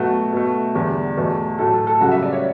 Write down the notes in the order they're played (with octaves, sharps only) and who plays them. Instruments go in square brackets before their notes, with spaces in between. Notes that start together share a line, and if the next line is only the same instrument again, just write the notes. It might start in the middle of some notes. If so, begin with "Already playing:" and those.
Already playing: [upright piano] B2 F#3 A3 F#4
B2 A3
E2 D3 G3 G4
E2 B2 A3
A2 F#3 A3 A4
A4
A4
F#2 C#3 G3 F#4
E5
D5
C#5